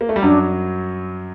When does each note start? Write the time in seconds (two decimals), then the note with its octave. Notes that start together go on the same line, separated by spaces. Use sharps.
0.01 A#3
0.09 A3
0.16 G3
0.22 F#2 F#3 D4